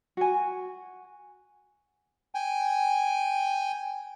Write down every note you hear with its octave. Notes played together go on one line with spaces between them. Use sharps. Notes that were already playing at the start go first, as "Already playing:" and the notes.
F#4 G#5
G5 G#5